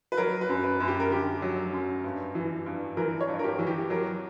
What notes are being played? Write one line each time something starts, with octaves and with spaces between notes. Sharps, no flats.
B4
F#3 A#4
B4
F#2
B4
F#2
G4
A#4
D3 G4
F#3
F#2
G2
E3
G2
E3 A#4
C#5
G2
A#4
G4
E3
G4
F#3 A#4